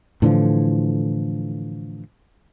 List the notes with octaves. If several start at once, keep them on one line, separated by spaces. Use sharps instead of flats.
A2 D3 E3 F3